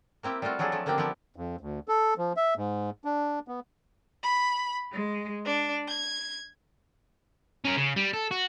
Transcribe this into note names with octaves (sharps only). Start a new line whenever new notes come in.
A#3 C4 E4 G4
G3 A3 C4 F4 F#4
F3 F#3 D4 G#4 A4
F3 A3
D3 A#3 C4 D4 G4
F3 B3 E4 G4
F2
D2
A4
F3
E5
G#2
D4
B3
B5
G#3
D4
G#6
C#4 A#4
C#3
G3
A4
F#4